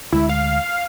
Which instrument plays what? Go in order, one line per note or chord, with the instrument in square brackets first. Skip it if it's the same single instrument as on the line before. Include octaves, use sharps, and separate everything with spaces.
[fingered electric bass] D2 G#3 [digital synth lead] E4
[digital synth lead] F5